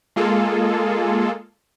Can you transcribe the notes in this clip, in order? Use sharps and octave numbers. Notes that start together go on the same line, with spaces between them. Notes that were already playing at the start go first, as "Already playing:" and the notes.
G#3 A#3 F4 G#4 A4